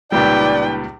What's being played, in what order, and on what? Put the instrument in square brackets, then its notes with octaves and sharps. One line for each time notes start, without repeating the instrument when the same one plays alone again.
[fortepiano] C#2 A#2 G3 [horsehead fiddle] D#4 B4 [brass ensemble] D5 [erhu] G5